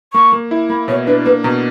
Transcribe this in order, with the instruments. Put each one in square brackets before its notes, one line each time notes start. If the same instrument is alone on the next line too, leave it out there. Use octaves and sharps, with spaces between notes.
[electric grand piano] A#3 [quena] C#6
[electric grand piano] A#3
E4
[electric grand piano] A#3 [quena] B5
[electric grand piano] B2 [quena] C#5
[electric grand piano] D4 [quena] B4
[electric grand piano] A#3 [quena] B4
[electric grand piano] B2 [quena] A#5